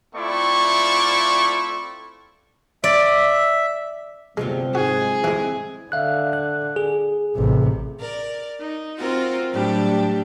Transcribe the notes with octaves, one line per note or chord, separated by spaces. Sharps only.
A3 C4 E4 F4 D5 C#6
D5 E5
D2 G2 C3 F3 F#3 G#3 B3
G#2 G#3 F#4 G#4
E3 G#3 C4 E4
D3 E5 F5 F#6
F#6
G#4
A1 C3
A#4 D5
D#4
C4 F4 F#4 A#4
A2 F#3 G3 D4 G4